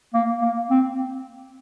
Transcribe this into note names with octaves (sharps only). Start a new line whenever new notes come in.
A#3
A#3
C4